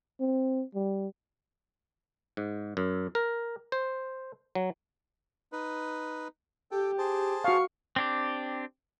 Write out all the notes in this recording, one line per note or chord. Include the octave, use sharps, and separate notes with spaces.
C4
G3
G#2
F#2
A#4
C5
F#3
D#4 B4
G4 A4 G5
G#4 C5 A5
F#4 F5 C#6
C4 D4 G4